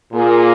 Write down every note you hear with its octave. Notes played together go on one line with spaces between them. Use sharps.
A#2 A#3 G#4